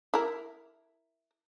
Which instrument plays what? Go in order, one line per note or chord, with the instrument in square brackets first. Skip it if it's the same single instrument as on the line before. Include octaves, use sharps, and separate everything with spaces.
[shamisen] E4 A#4